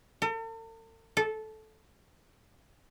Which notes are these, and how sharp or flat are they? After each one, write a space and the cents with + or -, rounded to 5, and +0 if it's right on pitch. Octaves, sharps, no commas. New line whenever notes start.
A4 +45
A4 -15